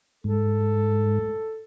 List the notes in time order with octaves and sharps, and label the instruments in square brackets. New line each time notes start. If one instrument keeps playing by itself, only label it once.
[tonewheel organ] G#2 [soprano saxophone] A4